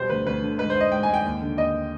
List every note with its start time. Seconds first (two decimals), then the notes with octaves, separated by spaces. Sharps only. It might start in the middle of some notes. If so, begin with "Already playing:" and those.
Already playing: B2 G3 C5
0.10 D2 B4
0.26 D2 B4
0.43 D3
0.58 G#2 B4
0.70 C5
0.75 G#2
0.81 D#5
0.92 G#2 G5
1.03 G#2 G#5
1.14 G5
1.25 D#2
1.42 D3
1.57 D#2 D#5